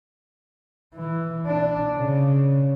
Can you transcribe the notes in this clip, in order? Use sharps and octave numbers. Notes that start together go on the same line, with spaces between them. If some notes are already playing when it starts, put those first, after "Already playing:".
E3
D4
C#3